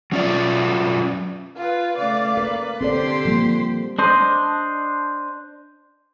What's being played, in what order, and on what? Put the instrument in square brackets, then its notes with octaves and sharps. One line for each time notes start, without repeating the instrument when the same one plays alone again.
[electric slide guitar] F#3 C#4 F4 D5
[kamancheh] F4 B4
[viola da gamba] C#3 A3 [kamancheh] D5 F5
[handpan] A#4 [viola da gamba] B4
[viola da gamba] D3 G4 C5 [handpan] C4 A4 D5 [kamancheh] C6
[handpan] F3 G3 A#3
[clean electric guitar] D4 C5 D#5